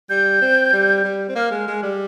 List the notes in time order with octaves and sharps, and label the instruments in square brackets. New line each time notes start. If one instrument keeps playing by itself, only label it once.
[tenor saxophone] G3 [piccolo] G6
[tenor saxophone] C4
G3
G3
C4
[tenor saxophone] A#3 [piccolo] F6
[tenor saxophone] G#3
G#3
G3